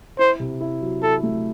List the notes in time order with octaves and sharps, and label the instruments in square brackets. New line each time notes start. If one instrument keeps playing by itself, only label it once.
[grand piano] E4 [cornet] C5
[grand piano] C3
E4
F#3
[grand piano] E4 [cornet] A4
[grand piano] A3